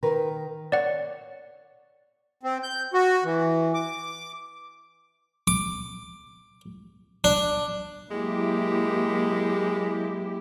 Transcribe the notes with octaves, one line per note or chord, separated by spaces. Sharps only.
D#3 A#4 B4
C#5 D5 F#5
C4
G6
F#4
E3
D6
D6
D4
F#3 G#3 A#3 E4 G4